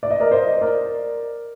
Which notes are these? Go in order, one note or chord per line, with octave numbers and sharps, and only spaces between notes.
D5
D#5
A#4 D5
C5 D#5
A#4 D5